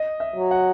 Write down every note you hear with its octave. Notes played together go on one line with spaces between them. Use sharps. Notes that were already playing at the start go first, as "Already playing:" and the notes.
Already playing: D#5
E5
F#3
F#5